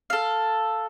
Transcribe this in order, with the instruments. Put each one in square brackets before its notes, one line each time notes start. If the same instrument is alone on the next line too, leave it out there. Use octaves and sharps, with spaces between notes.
[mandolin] A4 F5